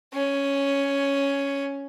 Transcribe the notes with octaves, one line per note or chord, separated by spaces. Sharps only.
C#4